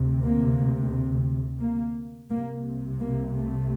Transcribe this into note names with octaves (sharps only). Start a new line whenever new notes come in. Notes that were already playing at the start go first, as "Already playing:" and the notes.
Already playing: D2 C3
A#3
A#3
C2 C3 A#3
A#3
A3